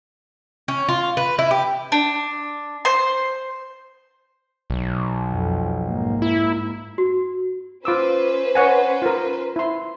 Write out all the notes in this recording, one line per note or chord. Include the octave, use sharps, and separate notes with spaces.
C#4
F4
B4
E4
G4
D4
C5 C6
B1
F2
G#2 A#3
E4
F#4
C#4 F4 B4 C5 D6 E6
C#5 F#5 G#5
F4 A#4
E4 C6